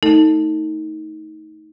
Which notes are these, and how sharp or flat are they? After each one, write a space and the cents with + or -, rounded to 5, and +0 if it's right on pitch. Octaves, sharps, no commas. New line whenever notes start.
A3 +0 D#4 +20 A4 +30